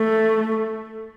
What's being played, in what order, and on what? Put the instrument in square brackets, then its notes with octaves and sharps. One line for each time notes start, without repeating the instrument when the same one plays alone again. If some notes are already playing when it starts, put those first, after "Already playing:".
Already playing: [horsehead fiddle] A3